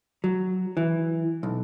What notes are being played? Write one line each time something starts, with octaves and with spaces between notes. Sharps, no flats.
F#3
E3
B1